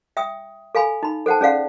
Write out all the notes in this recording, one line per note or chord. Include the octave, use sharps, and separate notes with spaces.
E5 G5 D#6
A4 F5 G#5 B5
D#4 B5
A4 C5 F#5 G5 A5
C#4 G#4 D5 F5 F#5